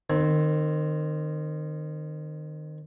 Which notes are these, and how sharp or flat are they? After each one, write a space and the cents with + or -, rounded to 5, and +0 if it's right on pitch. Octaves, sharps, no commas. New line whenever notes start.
D#3 -25 C4 +0